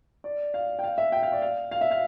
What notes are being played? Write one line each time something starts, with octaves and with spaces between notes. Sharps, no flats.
D5
F5
G5
F5
E5
G5
F5
D5
F5
F5
E5
F5